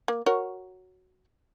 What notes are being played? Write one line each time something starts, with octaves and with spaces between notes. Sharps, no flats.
A#3
F#4 A#4 C#5